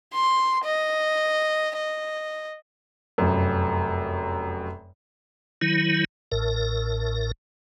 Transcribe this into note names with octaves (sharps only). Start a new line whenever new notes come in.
C6
D#5
D#5
F1 F#2
D#3 F#3 E4
A1 A2 A#4